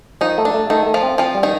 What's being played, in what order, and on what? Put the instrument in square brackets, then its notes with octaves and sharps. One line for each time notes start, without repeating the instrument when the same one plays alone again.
[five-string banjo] D#3 D#4 [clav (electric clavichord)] F3
[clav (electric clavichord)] A3
[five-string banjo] D4
[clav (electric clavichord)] A3
[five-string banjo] D#3 D#4 [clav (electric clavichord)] A3
[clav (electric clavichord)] A3
[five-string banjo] F3 F4
[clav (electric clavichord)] C4
[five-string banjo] F3 F4 [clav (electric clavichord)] C4
[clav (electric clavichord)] G3
[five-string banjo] D#3 D#4